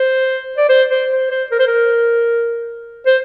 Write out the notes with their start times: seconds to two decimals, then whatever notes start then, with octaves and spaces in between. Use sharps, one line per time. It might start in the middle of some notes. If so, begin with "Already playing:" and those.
Already playing: C5
0.57 D5
0.69 C5
0.90 C5
1.11 C5
1.30 C5
1.51 A#4
1.59 C5
1.67 A#4
3.06 C5